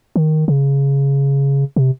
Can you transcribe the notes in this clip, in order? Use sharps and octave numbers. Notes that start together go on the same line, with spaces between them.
D#3
C#3
C3